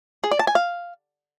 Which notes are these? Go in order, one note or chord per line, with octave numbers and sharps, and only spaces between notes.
G#4
D5
A5
G#5
F5